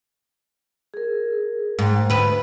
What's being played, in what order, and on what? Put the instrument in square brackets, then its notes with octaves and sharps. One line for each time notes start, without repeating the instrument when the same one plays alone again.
[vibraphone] G#4 A#4
[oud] G#2 [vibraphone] A3 G5
[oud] D2 B4 [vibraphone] B5